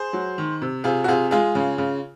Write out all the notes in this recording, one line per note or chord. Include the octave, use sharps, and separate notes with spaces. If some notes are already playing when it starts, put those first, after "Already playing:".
Already playing: G#4 C5
F#3
D#3
C3
C3 F4 G#4
F#4
C3 F4 G#4
G#3 F4 G#4
C#3
C#3